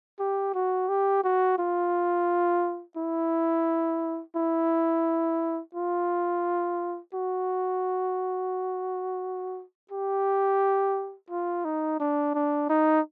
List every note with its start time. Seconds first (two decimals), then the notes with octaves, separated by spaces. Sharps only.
0.19 G4
0.54 F#4
0.89 G4
1.24 F#4
1.59 F4
2.97 E4
4.36 E4
5.75 F4
7.14 F#4
9.91 G4
11.30 F4
11.65 D#4
12.00 D4
12.34 D4
12.70 D#4